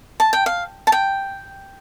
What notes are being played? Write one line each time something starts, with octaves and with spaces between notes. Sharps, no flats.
A5
G5
F5
A5
G5